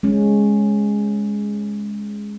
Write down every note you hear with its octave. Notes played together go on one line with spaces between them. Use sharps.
G#3 C#4